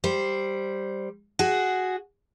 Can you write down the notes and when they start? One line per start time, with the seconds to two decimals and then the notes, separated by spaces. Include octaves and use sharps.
0.04 G3 C5
1.39 F#4 G#4